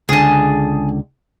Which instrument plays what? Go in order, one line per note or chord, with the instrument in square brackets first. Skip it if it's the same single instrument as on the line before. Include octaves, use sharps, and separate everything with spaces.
[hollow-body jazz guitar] C#2 D3 [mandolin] G#4 A5